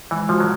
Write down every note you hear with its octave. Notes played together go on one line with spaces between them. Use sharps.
E3 G#3
F3 F#4
F#3